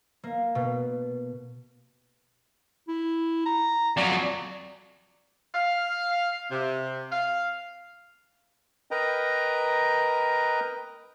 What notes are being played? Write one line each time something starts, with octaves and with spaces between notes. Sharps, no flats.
A#3
B2
E4
A#5
F2 F#3 D5
F5
C3
F5
A#4 B4 D#5 G5 A#5